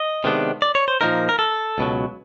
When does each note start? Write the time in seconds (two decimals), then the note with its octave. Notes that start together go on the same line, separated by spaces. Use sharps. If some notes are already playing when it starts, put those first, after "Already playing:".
Already playing: D#5
0.24 C3 D#3 G#3 B3 D4
0.62 D5
0.75 C#5
0.88 C5
1.01 A#2 F3 A#3 D#4 A#4
1.29 A#4
1.39 A4
1.78 C#2 B2 F#3